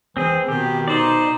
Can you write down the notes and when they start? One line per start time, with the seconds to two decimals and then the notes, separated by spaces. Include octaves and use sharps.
0.17 E3 C4 G#4
0.48 B2 D#3 G4
0.88 D#4 C5 D5